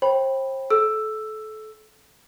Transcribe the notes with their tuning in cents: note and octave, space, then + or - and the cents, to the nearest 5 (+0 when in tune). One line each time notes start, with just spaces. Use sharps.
C5 +35 G5 +0 B5 +0
A4 -25 E6 +5